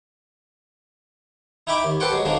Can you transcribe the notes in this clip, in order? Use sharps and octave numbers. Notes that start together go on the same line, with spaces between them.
D#4 E4 E5 G5 B5 D6
D#2
G4 A4 B4 C5 F#5 G5
F#3 G#3
D3 F3 F#3 C4 D4 D#4